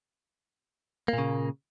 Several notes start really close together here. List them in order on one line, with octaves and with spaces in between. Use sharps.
A#3 A#2 C#3